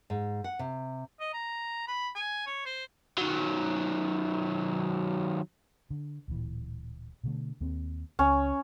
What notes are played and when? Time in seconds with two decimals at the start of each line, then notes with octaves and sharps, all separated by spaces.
0.10 G#2
0.44 F#5
0.59 C3
1.20 D#5
1.33 A#5
1.88 B5
2.15 G#5
2.46 C#5
2.66 C5
3.18 D#3 F#3
5.90 D3
6.28 D1 A#2 E3
7.24 B2 D3 A3
7.60 D#2 A#3 C4
8.19 C#2 C#4